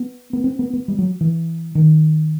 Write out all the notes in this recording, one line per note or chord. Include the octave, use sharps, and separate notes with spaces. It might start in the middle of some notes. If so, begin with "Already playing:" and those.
Already playing: B3
B3
C4
B3
B3
G3
F#3
E3
D#3